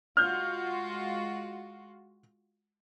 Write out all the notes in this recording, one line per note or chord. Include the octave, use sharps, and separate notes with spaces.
G#3 F4 F#4 F6 G6